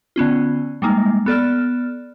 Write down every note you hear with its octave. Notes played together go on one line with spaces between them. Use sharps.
D3 B3 C#4 F4
G3 G#3 A#3 D#4
B3 A4 D5 F6